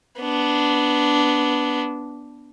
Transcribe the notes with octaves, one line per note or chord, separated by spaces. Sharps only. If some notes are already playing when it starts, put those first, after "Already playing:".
B3 D4